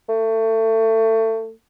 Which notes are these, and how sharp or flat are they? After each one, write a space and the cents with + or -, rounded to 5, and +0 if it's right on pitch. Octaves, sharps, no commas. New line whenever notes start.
A3 +25